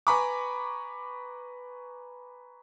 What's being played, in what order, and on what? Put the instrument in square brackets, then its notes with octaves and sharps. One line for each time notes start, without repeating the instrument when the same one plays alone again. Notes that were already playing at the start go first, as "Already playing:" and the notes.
[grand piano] B4 G#5 A#5 B5 C#6 D6